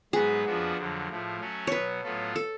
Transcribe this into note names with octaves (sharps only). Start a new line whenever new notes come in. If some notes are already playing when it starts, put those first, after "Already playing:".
G#2 F#3 B3 F#4 G#4 B4
F2 F3 B3 D4 F#4
F2 D3 F#3
A2 F3 A3
F#3 A3 C#4 F#4
B2 F#3 B3 B4 C#5
A2 F#3 B3 F4 A4
A4